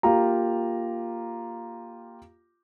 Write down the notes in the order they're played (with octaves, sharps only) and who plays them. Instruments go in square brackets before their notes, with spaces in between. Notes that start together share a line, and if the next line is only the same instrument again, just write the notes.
[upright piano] A#3 F4 G4 A#5